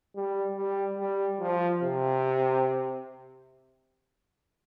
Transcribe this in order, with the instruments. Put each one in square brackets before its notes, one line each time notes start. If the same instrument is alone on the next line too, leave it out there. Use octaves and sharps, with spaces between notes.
[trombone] G3
G3
G3
F3
C3